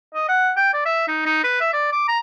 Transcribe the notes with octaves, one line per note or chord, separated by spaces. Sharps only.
D#5
F#5
G5
D5
E5
D#4
D#4
B4
E5
D5
D6
A#5